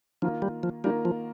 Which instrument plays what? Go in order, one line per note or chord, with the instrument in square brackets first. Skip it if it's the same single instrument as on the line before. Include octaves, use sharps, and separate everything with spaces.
[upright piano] D#3 A#3 F4 A#4 [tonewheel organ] F3
[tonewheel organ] G3
F3
[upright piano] D#3 A#3 F4 A#4 [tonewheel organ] G3
[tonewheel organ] F3